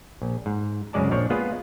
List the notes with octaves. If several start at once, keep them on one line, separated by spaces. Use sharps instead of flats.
A#1
G#2
C2 F#2 C#3 G#3 D5 A5
A#1 F3 D4 C#5
G#3 A#3 B3 F4 G#4